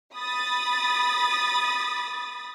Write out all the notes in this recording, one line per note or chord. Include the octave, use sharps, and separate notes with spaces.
B5 D#6 A6